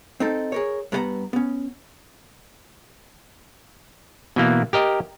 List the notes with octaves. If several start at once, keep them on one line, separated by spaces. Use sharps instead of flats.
C4 D#4 A4
G#4 A#4 C#5
G2 B3 F#4 A#4 F#5 A#5
B3 C#4
B2 E3 A#3
G4 A#4 D#5